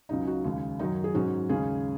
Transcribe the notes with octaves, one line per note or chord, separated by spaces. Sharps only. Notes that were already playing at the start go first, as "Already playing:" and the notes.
C#2 C#3 F#3 D#4
F#4
D#2 C#3 G#3
F#2 D#3 F#3 D#4
G#4
G#2 F#3 C#4 F#4
D#2 C#3 G#3 C#4 G#4